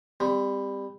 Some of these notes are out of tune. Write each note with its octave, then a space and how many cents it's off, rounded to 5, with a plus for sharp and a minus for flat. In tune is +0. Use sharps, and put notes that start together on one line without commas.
G3 +20 C4 -25